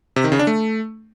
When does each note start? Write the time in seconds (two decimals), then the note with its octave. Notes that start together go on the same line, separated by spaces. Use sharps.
0.16 C3
0.24 D#3
0.32 C#3
0.39 D4
0.47 A3